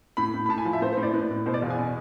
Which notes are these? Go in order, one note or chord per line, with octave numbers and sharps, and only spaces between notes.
A2 B5
A2
B5
A2 A5
G#5
F3
E5
A2 C5
C5
A2
D5
A2 B4
A2
B2 C5
D5
E2 F5
G#5
B2